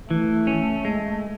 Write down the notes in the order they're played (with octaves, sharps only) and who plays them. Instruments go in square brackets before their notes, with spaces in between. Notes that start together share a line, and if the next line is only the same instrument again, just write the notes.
[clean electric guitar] E3 [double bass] A3
[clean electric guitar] C#4
G#3